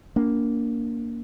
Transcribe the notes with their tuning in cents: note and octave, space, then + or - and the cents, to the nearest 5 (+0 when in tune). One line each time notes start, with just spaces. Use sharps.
A#3 +0 D4 -30